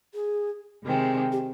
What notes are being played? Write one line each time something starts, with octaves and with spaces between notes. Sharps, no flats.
G#4
C3 D#3 G#3 C4
G4